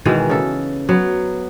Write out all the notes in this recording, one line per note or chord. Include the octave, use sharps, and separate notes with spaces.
B2 D#3 E3 G#3
C#3 A4
F#3 B3